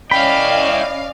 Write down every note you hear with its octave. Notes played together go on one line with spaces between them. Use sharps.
C#4 E4 D5 D#5 F5 G5 B5